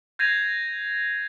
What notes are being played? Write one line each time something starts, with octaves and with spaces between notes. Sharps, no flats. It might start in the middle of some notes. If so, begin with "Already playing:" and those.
G6 G#6 A#6 C7 D#7 F7